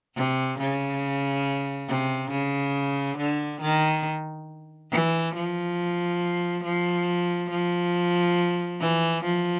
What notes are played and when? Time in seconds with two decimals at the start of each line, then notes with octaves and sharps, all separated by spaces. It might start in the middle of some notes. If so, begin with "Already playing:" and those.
0.15 C3
0.59 C#3
1.88 C3
2.31 C#3
3.17 D3
3.61 D#3
4.91 E3
5.35 F3
6.64 F3
7.50 F3
8.80 E3
9.24 F3